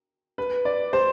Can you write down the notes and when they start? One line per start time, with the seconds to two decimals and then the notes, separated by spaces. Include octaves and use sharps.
0.38 B4
0.65 D5
0.93 C5